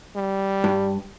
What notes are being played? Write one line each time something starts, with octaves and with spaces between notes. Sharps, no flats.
G3
G2